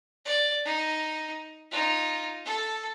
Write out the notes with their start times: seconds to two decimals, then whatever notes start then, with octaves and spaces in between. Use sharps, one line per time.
0.25 D5
0.65 D#4
1.71 D#4 F4
2.45 A4